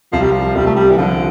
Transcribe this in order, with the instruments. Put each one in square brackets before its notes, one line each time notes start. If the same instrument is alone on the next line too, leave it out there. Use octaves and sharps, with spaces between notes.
[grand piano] C2 [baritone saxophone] F3
[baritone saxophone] G3
F3
[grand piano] C2 [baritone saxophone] G3
[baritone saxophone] A3
G3
E3
[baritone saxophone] D3 [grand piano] F3